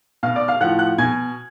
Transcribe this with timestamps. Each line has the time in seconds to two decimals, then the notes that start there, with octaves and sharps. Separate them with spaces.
0.23 B2 F5 F6
0.36 D5 D6
0.48 F5 F6
0.61 A2 F3 F#5 F#6
0.79 F#5 F#6
0.98 B2 G#5 G#6